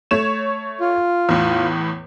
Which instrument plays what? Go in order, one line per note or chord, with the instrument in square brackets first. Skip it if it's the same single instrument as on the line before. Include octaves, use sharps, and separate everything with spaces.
[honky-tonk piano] A3 C#5 E7
[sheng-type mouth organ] F4
[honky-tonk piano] E2 A2